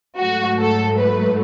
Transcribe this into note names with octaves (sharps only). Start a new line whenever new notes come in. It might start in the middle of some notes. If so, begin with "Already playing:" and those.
G#2 F#3 A3 F#4
A4
B4